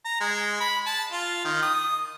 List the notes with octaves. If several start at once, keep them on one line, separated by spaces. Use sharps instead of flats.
A#5
G#3
B5
A5
F4
D#3
D#6